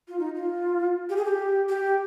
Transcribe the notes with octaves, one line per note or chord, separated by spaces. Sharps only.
F4
D#4
F4
G4
G#4
G4
G4